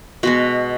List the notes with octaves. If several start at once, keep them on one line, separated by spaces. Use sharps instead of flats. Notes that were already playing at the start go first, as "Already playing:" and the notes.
B2 G#3 B3 F#4